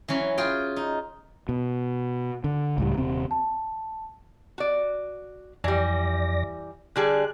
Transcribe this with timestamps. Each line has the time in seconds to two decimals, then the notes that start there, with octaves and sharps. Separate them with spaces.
0.08 E3 F#3 C#4
0.38 F4 G#4 G5
0.76 D#4
1.49 B2
2.44 D3
2.78 C#2 A2 G3
2.97 D#1 C3 C4
3.31 A5
4.58 F#4 D5
5.64 F2 E3 G3 D5 A#6
6.96 D3 G3 G#4 F#6